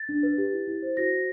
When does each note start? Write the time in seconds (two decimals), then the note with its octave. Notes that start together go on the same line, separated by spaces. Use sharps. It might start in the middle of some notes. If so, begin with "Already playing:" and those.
Already playing: A6
0.09 D4
0.23 B4
0.38 G4
0.53 E4
0.67 E4
0.82 C5
0.97 F#4 A#6
1.11 C5